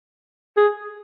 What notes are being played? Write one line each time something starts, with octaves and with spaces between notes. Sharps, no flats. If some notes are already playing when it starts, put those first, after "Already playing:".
G#4